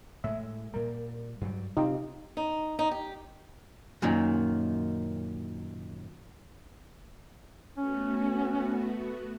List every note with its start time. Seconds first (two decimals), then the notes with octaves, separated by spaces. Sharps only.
0.24 A2 G#3 E5
0.74 A#2 G3 A#4
1.41 G2 F#3 G3
1.77 C3 C4 D#4 F4 G4
2.37 D#4
2.79 D#4
2.91 G4
4.02 F#2 A#2 D#3
7.77 A3 B3 C#4 F#4